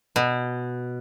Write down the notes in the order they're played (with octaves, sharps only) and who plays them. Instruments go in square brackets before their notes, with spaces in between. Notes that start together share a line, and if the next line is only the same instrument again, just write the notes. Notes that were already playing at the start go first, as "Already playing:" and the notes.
[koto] B2